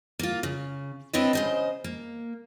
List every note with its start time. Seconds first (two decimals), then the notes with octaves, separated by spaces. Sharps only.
0.19 A#3 F4
0.43 C#3
1.13 C4 D4 E4 B4 C#5 D#5
1.33 C#3 C5 D#5
1.84 A#3